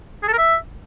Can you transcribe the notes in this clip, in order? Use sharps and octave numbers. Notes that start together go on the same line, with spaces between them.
G#4
A4
A#4
E5